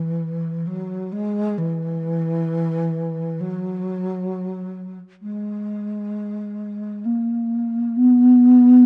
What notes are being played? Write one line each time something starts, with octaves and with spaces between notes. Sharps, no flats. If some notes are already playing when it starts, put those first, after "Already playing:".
Already playing: E3
F#3
G#3
E3
F#3
G#3
A#3
B3